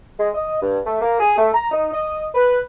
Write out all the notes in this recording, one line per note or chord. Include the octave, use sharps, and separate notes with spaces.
G#3
D#5
G2
A3
A#3
G#4
A3
A#5
D#4
D#5
B4